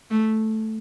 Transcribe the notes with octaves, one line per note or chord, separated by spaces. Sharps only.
A3